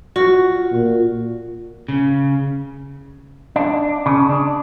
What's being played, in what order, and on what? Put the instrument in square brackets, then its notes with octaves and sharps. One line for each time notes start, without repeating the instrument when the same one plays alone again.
[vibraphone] F4 [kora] F#4
[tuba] A#2
[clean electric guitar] C#3
D4
C#3
D4